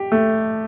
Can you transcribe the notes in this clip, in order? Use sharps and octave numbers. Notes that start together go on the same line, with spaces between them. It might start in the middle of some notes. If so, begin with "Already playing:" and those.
Already playing: G4
A3